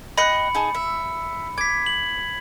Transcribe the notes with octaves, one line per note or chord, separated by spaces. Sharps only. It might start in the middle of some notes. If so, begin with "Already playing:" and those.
D#5 G5 B5 F#6 C#7
D#4 G#4 A5
E5
D6 G#6 B6
F#7